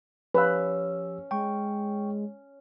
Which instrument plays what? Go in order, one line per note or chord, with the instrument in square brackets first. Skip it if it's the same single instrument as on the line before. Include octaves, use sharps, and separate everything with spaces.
[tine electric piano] F3 G4 E6 [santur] C#4 [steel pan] B4 F5
[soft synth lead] G#3 [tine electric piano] G5 C#6